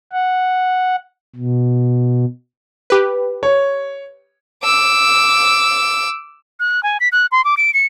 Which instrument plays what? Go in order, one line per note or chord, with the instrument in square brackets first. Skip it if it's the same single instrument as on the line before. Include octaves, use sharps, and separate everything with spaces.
[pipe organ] F#5
B2
[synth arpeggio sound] G4 B4
[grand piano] C#5
[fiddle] D6 E6
[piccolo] F#6
G#5
B6
F#6
C6
D6
D7
C#7